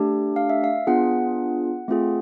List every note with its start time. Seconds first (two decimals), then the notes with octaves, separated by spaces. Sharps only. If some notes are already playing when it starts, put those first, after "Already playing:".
Already playing: A3 D4 G4
0.36 F5
0.50 E5
0.64 F5
0.87 B3 D4 F4 G#4 F#5
1.88 A3 C4 F4 G#4